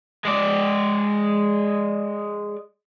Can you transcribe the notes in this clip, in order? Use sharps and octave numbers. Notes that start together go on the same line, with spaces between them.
G#3 D5